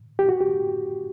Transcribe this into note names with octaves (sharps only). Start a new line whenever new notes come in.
G4
F#4
G4